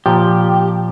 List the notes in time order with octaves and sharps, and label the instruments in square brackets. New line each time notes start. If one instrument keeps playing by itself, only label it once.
[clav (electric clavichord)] A#2 F3 [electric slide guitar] G4